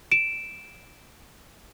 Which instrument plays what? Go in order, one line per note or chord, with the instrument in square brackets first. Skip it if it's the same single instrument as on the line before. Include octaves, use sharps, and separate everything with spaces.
[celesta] D7 E7